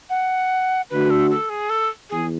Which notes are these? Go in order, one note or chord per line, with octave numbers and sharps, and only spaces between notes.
F#5
D3 A3 D4 F#4 B4
A4
A4
G#4
A4
E2 G#4